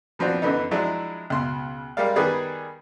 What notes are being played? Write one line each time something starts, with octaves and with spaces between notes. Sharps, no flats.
E3 F3 C4 D4 F#4
F#2 D3 E3 B3 D#4
F3 F#3 G#3 D4 E4
C#2 B2 C6
G3 G#3 A#4 D5 F5
D#3 G3 B3 G#4 B4 D5